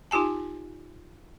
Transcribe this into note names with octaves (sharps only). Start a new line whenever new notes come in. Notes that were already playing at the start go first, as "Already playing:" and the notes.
D#4 F4 G4 G#5 A5